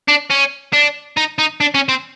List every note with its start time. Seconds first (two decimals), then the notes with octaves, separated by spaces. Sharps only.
0.08 D4
0.30 C#4
0.73 D4
1.17 D#4
1.39 D#4
1.61 D4
1.75 C#4
1.89 C4